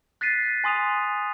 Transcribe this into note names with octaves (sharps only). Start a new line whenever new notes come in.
F#6 A6 B6 C7 D#7
G#5 C6 D#6 D#7 F7